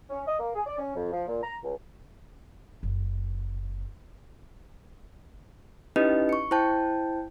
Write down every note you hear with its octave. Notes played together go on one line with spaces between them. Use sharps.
C#4
D#5
A#3
G#4
D5
C#4
F2
F3
A#2
A#5
C#2
F#1
C#4 D#4 E4 G4 B4 D#5
C#6 C#7
E4 C5 G5 A5 G6